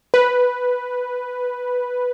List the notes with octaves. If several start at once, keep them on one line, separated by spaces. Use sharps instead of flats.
B4